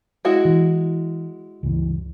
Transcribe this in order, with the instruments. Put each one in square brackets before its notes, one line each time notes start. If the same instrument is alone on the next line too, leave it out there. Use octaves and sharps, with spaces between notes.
[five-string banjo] G#3 E4 F#4
[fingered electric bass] E3
C#2 G2 E3